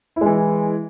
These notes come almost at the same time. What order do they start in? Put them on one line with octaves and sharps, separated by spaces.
E4 G#3 E3